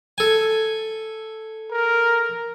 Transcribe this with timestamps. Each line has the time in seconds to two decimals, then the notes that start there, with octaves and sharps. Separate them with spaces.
0.18 A4 G#5
1.71 A#4